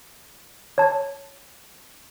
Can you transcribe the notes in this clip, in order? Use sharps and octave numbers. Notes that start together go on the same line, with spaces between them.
C#5 A5